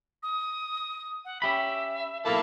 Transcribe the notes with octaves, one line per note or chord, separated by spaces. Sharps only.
D#6
F#5
C#4 G4 E5 B5
B1 A#3 E4 A4 F5 A5